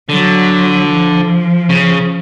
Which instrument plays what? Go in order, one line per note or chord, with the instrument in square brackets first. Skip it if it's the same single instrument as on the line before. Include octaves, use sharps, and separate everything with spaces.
[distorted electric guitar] D3 [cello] F#3
[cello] F3
[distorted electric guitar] C#3